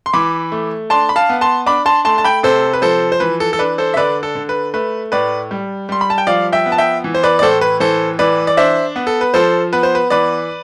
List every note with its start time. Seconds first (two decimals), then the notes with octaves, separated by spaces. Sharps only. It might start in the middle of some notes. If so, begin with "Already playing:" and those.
0.06 C6
0.13 E3 B5 D6
0.52 A3
0.90 D4 A5 C6
1.09 B5
1.16 F5 A5
1.29 B3
1.41 A5 C6
1.66 D4 B5 D6
1.86 A5 C6
2.05 A3 A5 C6
2.18 A5
2.24 G5 B5
2.43 C3 A4 C5
2.73 B4
2.82 F3 A4 C5
3.12 C5
3.20 E3 B4
3.40 A4
3.53 A4
3.59 D4 B4
3.78 A4 C5
3.94 E5
3.97 D3 B4 D5
4.23 A4
4.35 D3
4.49 B4
4.74 A3 B4
5.12 A2 B4 D5
5.51 G3
5.89 G3 C6
6.01 B5
6.10 A5
6.18 G5
6.27 F3 D5 F5
6.53 E5 G5
6.66 B3
6.72 A5
6.78 E5 G5
7.04 E3
7.15 C5
7.23 B4 D5
7.39 D5
7.42 A2 A4 C5
7.61 B4
7.80 E3 A4 C5
8.19 E3 B4 D5
8.47 D5
8.57 D4 C5 E5
8.96 B3
9.07 A4
9.21 B4
9.34 F3 A4 C5
9.73 B3 B4
9.83 C5
9.95 B4
10.10 E3 B4 D5